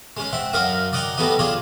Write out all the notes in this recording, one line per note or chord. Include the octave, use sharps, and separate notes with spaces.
G#3 C#4
C4 E5 F#5
F#2 F#3 F#4 A#4 F5 D#6
D5 D#5 F#5 G5 A#5 C#6
F#3 G3 A3 B3 F#4 D#5
D4 F4 G#4 C#5